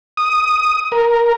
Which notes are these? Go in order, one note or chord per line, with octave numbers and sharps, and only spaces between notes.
D#6
A#4